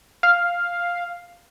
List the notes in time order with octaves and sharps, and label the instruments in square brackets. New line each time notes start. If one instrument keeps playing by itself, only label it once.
[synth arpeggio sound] F5